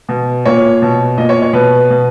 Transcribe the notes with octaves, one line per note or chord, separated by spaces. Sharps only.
B2
A#2 C#5
B2
A#2 D#5
C#5
C#5
B2 B4
B2